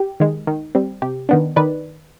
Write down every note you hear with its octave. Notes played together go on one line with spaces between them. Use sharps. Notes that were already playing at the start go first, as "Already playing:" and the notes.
Already playing: G4
D#3 G#3
D#3
G3 C4
C3 G4
D#3 B3 D4
D#3 B4 D5